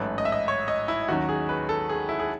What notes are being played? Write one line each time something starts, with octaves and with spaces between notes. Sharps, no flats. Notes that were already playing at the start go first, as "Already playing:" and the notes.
Already playing: A1 G#2 F#3 A3 C#4 B4
D#5
E5
D#5
C#5
D#5
E4
D#2 D#3 F#3 C#4 F#4
G#4
B4
A4
G#4
E4
G#4